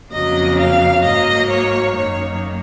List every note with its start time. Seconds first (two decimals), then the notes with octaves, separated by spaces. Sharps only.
0.12 F2 C#3 F#3 A#3 D#5
0.59 F5
1.04 G#2 F#3 A#3 D#5
1.51 C#5
1.97 F#2 D#3 A#3 C#5